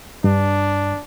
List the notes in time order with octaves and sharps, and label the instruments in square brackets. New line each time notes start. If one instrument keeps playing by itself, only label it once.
[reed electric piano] G2 [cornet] D4